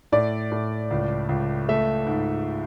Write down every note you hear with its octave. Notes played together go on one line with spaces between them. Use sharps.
A2 D5
A2
C#2
C#2
A3 E5
G#2